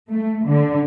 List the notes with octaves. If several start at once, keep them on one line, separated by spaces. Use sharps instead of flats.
A3
D3